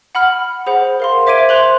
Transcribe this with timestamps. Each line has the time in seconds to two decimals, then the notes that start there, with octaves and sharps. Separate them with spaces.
0.15 F#5 B5 F6
0.67 G#4 C5 F#5 B5
1.00 A#4 F5 C6
1.27 C5 E5 D6 G#6 D7 D#7
1.49 C5 C6 F#6 F7 F#7